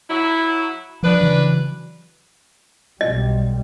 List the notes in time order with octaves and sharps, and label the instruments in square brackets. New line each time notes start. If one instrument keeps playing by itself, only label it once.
[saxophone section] F#3 E4
[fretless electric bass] F3 [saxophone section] D4 B4
[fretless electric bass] C#3 E3 F#3
[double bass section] B1 G3 [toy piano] D#5